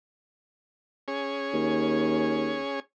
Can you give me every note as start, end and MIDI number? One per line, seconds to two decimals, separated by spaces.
1.08 2.80 61
1.08 2.80 68
1.08 2.80 73
1.53 2.58 39